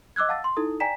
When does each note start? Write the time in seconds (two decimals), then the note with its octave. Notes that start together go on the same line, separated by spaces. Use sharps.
0.16 D#5 D6 E6 F#6 G#6
0.29 F5 F#5 A5 E6 A6
0.44 C6
0.57 D#4 E4 A4 D#6
0.80 D5 G5 G#5 A#5 B6 E7